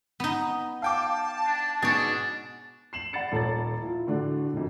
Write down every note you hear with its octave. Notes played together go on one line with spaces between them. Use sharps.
B3 D#4
F5 G5 A5 D6
D4
G#2 B2 D4 G#4 C#5 A6
C7 E7 F#7
D5 F#5 B5 A6 C#7
D#1 A4 C#5 A6
E4 F4
A2 D3 A3 D4 F#4
E1 F2